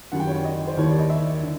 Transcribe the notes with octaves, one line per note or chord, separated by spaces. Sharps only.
F#2 D#3 G3 F#5
G5
C#5
D5
D#5
C5
D#2 D#3 G3 C#5
D5
D#5
E5
D3